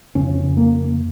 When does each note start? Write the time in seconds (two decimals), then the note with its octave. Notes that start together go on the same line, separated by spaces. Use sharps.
0.15 F2 C#3 C#4
0.57 A#3